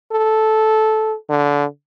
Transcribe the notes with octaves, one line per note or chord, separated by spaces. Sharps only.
A4
D3